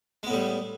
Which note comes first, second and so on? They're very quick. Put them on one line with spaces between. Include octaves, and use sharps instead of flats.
G#3 B3 A2 G3